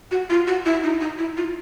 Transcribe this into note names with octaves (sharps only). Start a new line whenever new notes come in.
F#4
F4
F#4
E4
D#4
D#4
E4
F4